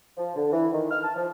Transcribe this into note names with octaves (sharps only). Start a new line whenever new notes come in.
F3
D3
E3
D#3
F6
A5
F3